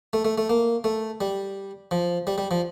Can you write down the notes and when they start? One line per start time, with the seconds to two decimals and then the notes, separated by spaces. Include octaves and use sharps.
0.13 A3
0.25 A3
0.38 A3
0.49 A#3
0.84 A3
1.21 G3
1.91 F3
2.27 G3
2.38 G3
2.51 F3